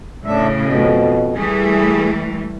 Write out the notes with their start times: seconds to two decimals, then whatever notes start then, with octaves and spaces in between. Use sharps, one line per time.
0.25 A2 C#3 D4 E5
0.61 F2 B2
1.34 E3 G3 A3 G#4